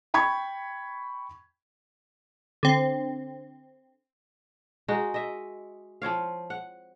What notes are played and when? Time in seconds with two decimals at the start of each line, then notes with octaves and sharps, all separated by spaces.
0.14 G5 B5 C#6 G#6
2.63 D3 C4
4.88 G#3 D#4 F#4
5.14 D#5 E5
6.02 F3 C4 C#5 F5
6.50 F#5